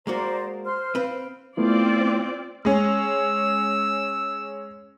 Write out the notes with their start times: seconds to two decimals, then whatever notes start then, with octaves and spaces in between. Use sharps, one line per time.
0.07 G#3 A#3 F#4 C5 D5 A#5
0.65 C5 C6 F6
0.95 C4 B4 F5
1.57 A3 B3 C4 E4 F4 D5
2.65 G#3 C#4 E6